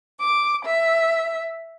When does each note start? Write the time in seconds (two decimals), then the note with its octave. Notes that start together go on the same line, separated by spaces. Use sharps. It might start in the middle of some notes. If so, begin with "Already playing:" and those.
0.20 D6
0.65 E5